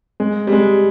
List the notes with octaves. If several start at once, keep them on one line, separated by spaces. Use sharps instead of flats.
G#3
G3
G#3